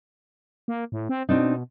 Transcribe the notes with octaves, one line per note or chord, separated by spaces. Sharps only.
A#3
A2
C4
B2 C4 D4 D#4